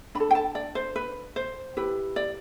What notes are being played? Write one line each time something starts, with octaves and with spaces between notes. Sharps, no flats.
D4 B5
A4
G5
A5
D5
C5
B4
C5
E4 G4 B4
D5